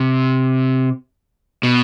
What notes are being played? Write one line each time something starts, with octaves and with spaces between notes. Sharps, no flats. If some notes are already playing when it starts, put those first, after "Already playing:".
Already playing: C3
B2